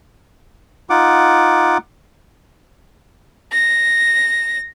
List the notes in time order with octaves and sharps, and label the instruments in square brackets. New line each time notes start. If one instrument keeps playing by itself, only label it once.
[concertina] D#4 F4 F#5 D6
[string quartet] A#6